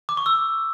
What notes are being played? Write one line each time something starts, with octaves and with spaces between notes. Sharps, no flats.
D6
C#6
E6